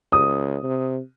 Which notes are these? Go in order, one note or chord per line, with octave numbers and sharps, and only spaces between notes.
C#2 D#6
C3